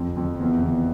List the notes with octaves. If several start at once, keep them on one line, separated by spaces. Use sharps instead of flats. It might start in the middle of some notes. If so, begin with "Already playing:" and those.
Already playing: F2
F2
E2
E2